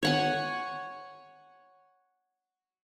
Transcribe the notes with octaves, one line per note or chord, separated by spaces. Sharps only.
C#5 F#5 G#5